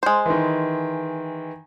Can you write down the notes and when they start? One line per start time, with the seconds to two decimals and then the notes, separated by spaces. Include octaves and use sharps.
0.03 G#3 C5
0.26 D#3 E3